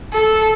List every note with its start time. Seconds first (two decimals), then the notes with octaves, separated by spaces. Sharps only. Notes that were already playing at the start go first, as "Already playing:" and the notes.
0.13 A4